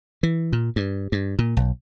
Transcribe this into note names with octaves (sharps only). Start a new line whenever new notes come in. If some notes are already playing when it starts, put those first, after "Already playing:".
E3
A#2
G2
G2
A#2
B1